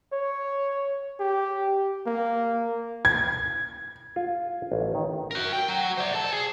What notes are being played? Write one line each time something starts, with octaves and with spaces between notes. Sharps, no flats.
C#5
G4
A#3
G#6
F4
A1
D#3
F#4 A#4
G5
F#3
C5 D5
A4 A5
G#4